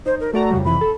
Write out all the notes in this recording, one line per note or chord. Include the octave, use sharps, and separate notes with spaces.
D#4 C5
A#4
A3 F#4 D5 A#5
F2 C#3 G3
F2 C3 E3 B5
A4